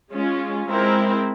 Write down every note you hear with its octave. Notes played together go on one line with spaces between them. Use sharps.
G#3 C#4 F4
G#3 C4 E4 A#4